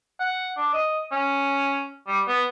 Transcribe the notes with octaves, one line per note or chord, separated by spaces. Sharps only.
F#5
D4
D#5
C#4
G3
B3